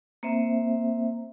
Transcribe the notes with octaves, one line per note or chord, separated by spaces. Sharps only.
A#3 C4 C5 E5